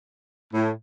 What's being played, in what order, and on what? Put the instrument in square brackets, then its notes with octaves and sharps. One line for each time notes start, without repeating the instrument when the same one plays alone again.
[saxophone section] A2